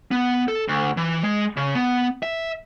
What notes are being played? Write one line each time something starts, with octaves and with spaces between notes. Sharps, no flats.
B3
A4
D2
E3
G#3
C#3
B3
E5